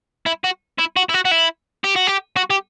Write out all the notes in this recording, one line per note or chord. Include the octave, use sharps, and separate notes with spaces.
E4
F#4
E4
F#4
E4
F#4
F#4
E4
G4
F#4
G4
F#4
G4